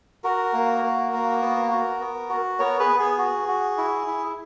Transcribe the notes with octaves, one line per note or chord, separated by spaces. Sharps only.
F#4 A#4
A#3
A#3
A#3
B3
F#4
B3
F#4
B3 A#4 C#5
G#4 B4
B3
G#4
F#4
F#4
E4
E4